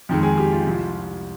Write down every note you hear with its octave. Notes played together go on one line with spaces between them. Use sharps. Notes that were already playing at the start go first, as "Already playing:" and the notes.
F2 D#3 G#3
G#4
G4
F4
C2 C3 F3